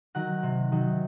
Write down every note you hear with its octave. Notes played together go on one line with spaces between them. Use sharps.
D#3 F#3 F#5
C3
D#3 F#3